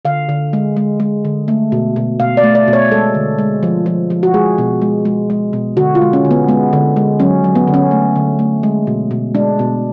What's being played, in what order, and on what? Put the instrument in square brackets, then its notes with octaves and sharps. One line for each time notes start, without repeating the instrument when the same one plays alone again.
[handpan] D3 F5
D3
G#3
G#3
G#3
D3
A3
B2
B2
B2 F5
D5
A3
D5
B2
C#5
G#3 A4
D3
G#3
F3
F3
F3
F#4
G#3 G#4
B2
G#3
G#3
G#3
B2
D3 F#4
F4
G#3
C#4
D3
B3
G#3 B3
D3
G#3
F#3 C#4
F#3
B3
D3
C#4
A3
D3
A3
G#3
B2
B2
G#3 D4
B2